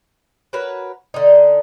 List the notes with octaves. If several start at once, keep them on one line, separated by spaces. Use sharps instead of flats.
F#4 A#4 B4 C#5
D3 D#4